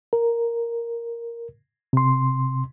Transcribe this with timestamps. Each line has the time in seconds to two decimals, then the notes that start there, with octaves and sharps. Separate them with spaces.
0.13 A#4
1.93 C3 C6